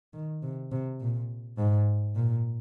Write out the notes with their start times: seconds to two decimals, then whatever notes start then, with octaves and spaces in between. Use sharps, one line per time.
0.14 D#3
0.43 C3
0.72 C3
1.01 A#2
1.58 G#2
2.16 A#2